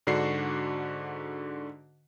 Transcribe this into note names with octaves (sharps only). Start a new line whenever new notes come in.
G#2 D3 D4 F#4 C7